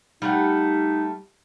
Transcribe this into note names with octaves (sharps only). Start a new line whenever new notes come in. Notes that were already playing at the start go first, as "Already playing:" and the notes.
G3 A3 D#4 F#5